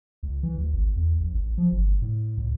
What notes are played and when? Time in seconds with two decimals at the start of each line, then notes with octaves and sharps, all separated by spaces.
0.23 C#2
0.43 E3
0.58 D2
0.73 G#1
0.96 E2
1.20 A#1
1.35 A1
1.58 F3
1.71 G1
2.02 A2
2.37 C#2